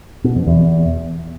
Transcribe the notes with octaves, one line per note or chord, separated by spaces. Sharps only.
B2
F2
E2